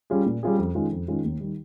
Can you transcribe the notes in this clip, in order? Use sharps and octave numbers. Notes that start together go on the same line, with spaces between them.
G3 C#4 F4 G#4
A#2
G3 C#4 F4 G#4
F2
D#3 G#3 C#4 F4
F2
D#3 G#3 C#4 F4
D#2
D#3 G3